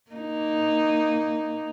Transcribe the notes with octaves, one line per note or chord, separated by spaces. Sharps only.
A#3 D#4